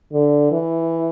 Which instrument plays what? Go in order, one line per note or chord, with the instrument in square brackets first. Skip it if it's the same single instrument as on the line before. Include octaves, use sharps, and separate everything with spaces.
[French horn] D3
E3